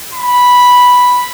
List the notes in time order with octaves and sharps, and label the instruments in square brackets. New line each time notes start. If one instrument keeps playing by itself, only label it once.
[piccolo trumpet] B5